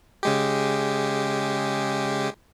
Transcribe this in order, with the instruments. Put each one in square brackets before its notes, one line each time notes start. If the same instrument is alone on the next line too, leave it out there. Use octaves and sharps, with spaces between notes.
[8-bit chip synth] C#3 G#3 G4